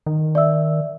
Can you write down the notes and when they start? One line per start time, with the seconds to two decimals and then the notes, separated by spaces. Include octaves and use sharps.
0.06 D#3
0.35 D5 E5 E6